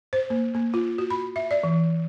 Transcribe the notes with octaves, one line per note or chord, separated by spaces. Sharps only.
C5
A#3
A#3
F4
F#4
B5
E5
D5
E3